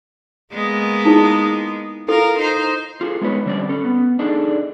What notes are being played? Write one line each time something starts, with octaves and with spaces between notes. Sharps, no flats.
G#3 A#3 B3
D#4 E4 G#4
E4 F4 A4 A#4
D#4 C5
F4 G#4 A4
G#3 B3 D#4 E4 B4 C#5
D3 G3 C4 C#4 G4 D5
C#4 A4
B3
D4 D#4 G#4 A4 D5